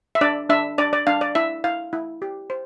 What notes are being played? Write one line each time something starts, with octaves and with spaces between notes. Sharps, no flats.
E5
D4 D5
D4 E5
D4 D5
D5
D4 F5
D5
E4 E5
E4 F5
E4
G4
C5